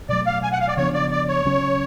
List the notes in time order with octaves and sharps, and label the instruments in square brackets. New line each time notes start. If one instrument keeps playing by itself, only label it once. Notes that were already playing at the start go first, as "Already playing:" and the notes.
[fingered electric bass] B2 F#3 A3 [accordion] D5
[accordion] F5
G#5
F#5
F5
D5
[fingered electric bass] C#3 F3 B3 D4 [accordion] C#5
[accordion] D5
D5
C#5
[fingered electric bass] C#3 F#3 C#4